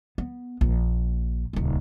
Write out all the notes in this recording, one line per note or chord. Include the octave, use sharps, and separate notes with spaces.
B3
A#1
D#1 C#2